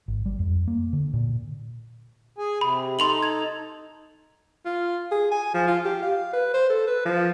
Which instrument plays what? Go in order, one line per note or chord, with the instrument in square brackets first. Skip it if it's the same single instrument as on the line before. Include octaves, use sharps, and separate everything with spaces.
[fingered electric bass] G#1
G3
F2
A#3
D3
A#2
[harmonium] G#4 G#5
[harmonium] C3 [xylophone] B5
[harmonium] D#4 A4 [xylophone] C6 F7 F#7
[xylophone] G#6 F7
[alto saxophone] F4
G#4
G#5
F3
F4
G4
F5
B4
C5
A4
B4
F3